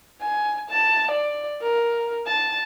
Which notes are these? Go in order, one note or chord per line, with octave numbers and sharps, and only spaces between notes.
G#5
A5
D5
A#4
A5